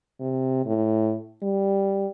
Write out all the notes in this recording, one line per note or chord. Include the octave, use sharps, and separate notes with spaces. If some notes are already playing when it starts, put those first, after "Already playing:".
C3
A2
G3